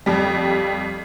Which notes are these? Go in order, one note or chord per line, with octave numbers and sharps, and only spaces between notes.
F2 G3